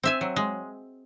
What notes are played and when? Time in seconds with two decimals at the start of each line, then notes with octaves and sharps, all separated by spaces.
0.03 C4 E5 G#5
0.21 F#3
0.36 G#3